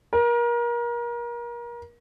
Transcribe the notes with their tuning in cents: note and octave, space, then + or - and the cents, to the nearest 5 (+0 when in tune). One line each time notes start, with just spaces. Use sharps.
A#4 +30